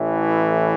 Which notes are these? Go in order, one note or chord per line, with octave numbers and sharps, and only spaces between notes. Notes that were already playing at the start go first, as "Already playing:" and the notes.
Already playing: A1 A2 E3